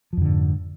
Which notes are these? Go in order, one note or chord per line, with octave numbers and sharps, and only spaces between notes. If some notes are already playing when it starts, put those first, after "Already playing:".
F2 G#2 D3 F3